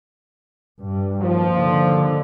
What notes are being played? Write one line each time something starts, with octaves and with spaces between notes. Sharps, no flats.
G2
D#2 F3
D3